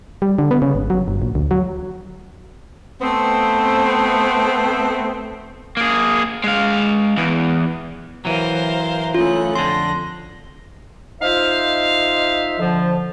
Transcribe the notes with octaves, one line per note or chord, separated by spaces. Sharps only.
G3
D3
B3
C#3
G#1
F#3
G1
A#1
D2
F#3
A3 B3 C4
A#3 G#4
G#3 F5
E2 E3
E3 F#3 A#4 C5 F5
C#3 A3 F4 F#6
F2 D3 C6 A#6
D#4 F4 C5 E5 F5
D3 F3